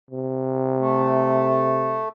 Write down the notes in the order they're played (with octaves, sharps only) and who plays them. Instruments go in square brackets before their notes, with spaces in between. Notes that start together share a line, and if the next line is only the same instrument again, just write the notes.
[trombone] C3
[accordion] A3